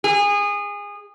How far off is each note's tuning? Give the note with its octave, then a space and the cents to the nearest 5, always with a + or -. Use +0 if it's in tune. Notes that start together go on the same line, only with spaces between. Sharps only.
G#4 -25